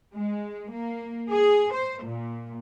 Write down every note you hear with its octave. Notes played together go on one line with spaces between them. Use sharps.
G#3
A#3
G#4
C5
A#2